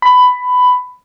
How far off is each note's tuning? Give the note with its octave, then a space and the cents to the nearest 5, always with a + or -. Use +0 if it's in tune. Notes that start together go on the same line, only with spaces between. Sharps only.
B5 +15